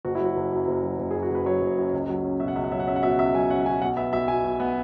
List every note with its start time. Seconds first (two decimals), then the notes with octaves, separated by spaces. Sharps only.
0.05 F#1 F#4
0.15 E4
0.21 F#3 F#4
0.37 F#1
0.52 F#2
0.68 F#1
0.83 F#3
0.99 F#1
1.11 G#4
1.15 F#2
1.22 F#4
1.31 F#1 B4
1.46 F#3 C#5
1.62 F#1
1.78 F#2
1.93 C#2
2.09 F#3
2.24 C#4
2.40 B2 E5
2.48 F#5
2.55 C#2 E5
2.64 F#5
2.72 F#3 E5
2.80 F#5
2.87 C#4 E5
2.96 F#5
3.03 B2 E5
3.11 F#5
3.19 C#2 E5
3.34 F#3 G#5
3.50 C#4 F#5
3.66 B2 G#5
3.82 B1 F#5
3.97 B3 E5
4.13 B1 E5
4.28 B2 G#5
4.44 B1
4.60 B3